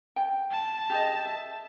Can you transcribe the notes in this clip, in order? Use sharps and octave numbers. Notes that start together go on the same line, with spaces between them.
G5
A5
G4 G#4 D#5
E5